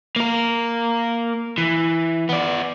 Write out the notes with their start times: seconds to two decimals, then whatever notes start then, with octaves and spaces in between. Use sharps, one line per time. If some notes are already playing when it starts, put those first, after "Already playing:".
0.16 A#3 A#4
1.58 E3
2.29 B3 D5